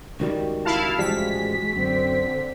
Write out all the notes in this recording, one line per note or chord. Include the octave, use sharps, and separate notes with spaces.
C#2 D#3 G3 F#4
E4 F5 A5
A1 F3 G3 G#3 B6
F#2 D3 C4